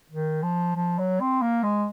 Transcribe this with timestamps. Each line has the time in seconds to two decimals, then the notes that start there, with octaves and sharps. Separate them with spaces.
0.10 D#3
0.42 F3
0.76 F3
0.98 F#3
1.20 C4
1.41 A#3
1.63 G#3